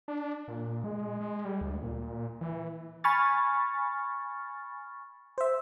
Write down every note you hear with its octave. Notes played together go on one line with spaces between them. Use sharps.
D4
A#2
G#3
G#3
G3
D2
A#2
E3
G#5 B5 C#6 F6 A6
C5 E5